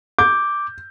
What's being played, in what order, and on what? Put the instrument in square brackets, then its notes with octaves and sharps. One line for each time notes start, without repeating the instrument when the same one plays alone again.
[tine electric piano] D6 [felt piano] G6